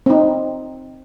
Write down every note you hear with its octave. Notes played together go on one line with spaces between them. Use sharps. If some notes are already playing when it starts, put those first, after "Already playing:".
C4 D#4